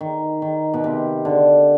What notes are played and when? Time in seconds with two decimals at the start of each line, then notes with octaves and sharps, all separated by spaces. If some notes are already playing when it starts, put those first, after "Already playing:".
0.01 D#3
0.42 D#3
0.74 B2
0.84 C3
1.25 D3